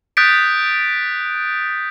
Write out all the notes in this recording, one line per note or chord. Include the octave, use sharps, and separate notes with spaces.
D#6 F#6 G6 A6 B6 D7